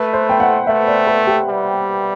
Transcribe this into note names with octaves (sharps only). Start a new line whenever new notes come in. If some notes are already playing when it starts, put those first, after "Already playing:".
Already playing: A3 B4
C5
G5
F#5
A3 E5
D5
B4
G4
G3